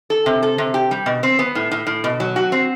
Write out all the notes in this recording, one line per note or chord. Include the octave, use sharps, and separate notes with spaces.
A4
C3
A4
C3
G4
G3
B2
C4
B3
A2
A2
A2
B2
F#3
F#4
C4